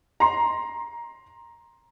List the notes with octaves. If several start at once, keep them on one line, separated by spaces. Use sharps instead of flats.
A#5 C6